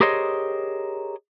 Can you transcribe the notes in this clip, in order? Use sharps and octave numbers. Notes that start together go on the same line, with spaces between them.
G4 G#4 A#4 C5 C#5 D#5